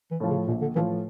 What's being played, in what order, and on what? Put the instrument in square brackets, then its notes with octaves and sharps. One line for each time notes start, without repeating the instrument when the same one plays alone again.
[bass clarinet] E3
[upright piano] A2 F3
[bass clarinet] C#3
[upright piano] A#1 [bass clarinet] A#2
[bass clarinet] D3
[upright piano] A2 F3 [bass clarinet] E3